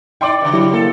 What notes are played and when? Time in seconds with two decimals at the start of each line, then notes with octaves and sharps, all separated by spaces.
0.21 D#4 D5 G5 C6 D6
0.41 G2 C#3
0.53 F#3 E4 G4
0.74 A#3 A4